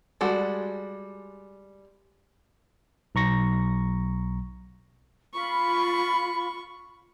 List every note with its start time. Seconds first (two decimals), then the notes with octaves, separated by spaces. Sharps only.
0.21 G3 G#3 F#4 A4
3.15 B1 A#5 C#6 A#6
5.34 F4 B5 C#6